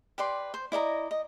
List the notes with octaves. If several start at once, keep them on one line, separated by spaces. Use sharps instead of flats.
G4 B4 D5 C6
C5
E4 D5 D#5 A#5
D#5